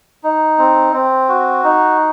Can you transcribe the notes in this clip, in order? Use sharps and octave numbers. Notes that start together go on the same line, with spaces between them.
D#4
C4
C4
F#4
D#4